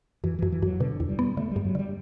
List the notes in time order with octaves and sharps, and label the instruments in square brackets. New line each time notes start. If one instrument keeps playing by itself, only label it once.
[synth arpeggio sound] F#2 [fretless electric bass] E3
[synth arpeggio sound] F#2 [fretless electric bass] E3
[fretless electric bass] E3
[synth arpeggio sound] F#2 [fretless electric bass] F#3
[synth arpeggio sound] B2 [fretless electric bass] D3
[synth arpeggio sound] E2
[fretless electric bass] G3
[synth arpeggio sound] B3
[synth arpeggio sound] D3 [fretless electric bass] A3
[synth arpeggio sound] G2 [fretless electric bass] G3
[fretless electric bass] F#3
[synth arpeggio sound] D3 [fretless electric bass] G3